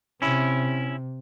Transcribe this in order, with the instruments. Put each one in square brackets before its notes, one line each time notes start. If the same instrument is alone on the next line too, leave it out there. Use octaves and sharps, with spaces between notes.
[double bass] C3 [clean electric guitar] C#4 E4